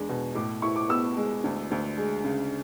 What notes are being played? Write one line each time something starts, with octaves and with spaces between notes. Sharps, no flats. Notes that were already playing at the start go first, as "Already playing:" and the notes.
Already playing: E2 G#3 D4
B2
A2 D6
E4 C#6
D6
B3 E6
G#3
D2
D2
G#3
C#3